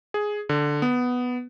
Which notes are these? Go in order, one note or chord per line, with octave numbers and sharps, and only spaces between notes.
G#4
D3
B3